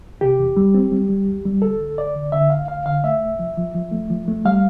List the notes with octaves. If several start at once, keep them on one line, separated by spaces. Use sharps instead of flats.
C3 G4
E2
G3
C4
G3
G3
E2
G3
D2 A4
D2
D2 D5
D3
D3 E5
D2 F5
D2 F5
D3 F5
A3 E5
C2
F3
F3
F3
A3
F3
A3
G3 F5